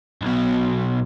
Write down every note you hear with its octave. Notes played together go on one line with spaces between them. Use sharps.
B1 B2